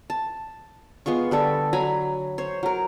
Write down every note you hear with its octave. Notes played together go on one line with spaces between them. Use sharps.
A5
G#3 B3 F4 C#6
D3 G3 A4 C#6
F#3 G#5 A#5 B5
C5 C#5
F#3 A#4